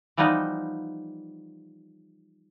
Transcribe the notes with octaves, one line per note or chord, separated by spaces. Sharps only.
E3 F3 G3 B3 D#4